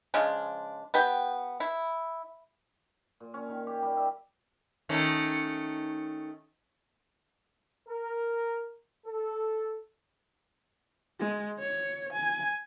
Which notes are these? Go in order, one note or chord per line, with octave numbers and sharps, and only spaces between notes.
C#3 F3 G#3 D4
B3 G4 G5
E4
A#2
C#4
D#3
G4
G3
E5
D#3 A3 C#4
A#4
A4
G#3
C#5
G#5